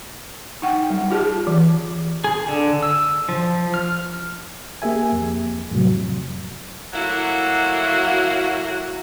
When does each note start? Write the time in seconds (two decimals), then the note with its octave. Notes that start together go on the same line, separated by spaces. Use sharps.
0.62 D#4 F#5 G5
0.90 G3
1.10 F4 G4 G#4 A5
1.47 E3
2.24 G#4
2.48 D3
2.83 E6
3.29 F3
3.74 F6
4.82 A#3 G4 G#4 E5 G#5
5.12 F2
5.71 F2 A2 C3 F#3
6.93 F#3 A3 A#3 E4 F#4